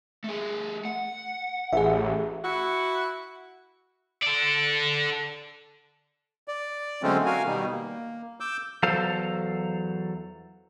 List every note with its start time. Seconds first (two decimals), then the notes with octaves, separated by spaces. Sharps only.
0.24 A3 G#4
0.85 F#5
1.73 A1 G#4 E5
2.44 E4 F#4 F#5
4.23 A4 D5
6.48 D5
7.03 D3 F#3 G#3 A3 C4 C#4
7.26 F#4 A#4 F5 G#5
7.45 B2 D#3 G3
7.70 A#3
8.40 D6 E6 G6
8.83 E2 F#3 A4 C5 F5